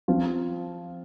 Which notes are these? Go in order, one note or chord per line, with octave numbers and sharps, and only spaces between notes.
F3 C4 F4